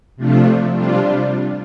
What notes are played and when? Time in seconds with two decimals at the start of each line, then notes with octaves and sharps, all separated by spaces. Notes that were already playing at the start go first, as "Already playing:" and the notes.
0.16 C3 F3 A3 D4 F4
0.75 C3 G3 D4 F4